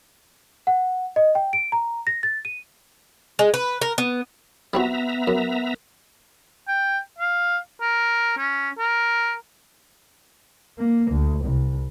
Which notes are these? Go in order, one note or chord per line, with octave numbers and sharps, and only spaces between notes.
F#5
D#5
G5
D7
A#5
A#6
A6
D#7
G#3
B4
A#4
B3
G3 B3 C4 F#4 E5 A#5
F#2
G5
F5
A#4
C#4
A#4
A#3
D2
C2